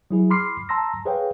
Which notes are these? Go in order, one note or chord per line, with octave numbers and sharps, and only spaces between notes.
F#3 E4 G#4
B5 C6 D6 F6 C7
A5 A#5 C6 E6 A#6
G#4 B4 C#5 F5 G5